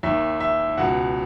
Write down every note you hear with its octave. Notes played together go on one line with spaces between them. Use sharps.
D#2 D#3 E5
E5
C#2 B2 F#5